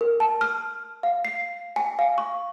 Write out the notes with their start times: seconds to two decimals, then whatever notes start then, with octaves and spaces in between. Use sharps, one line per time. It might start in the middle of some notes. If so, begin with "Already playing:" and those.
0.01 A#4
0.20 A5
0.41 F6
1.03 F5
1.25 C7
1.76 G#5
1.99 F5
2.18 C#6